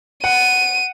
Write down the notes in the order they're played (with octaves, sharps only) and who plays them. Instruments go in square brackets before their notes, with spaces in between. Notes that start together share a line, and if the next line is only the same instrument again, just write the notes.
[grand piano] F#5 [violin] D#7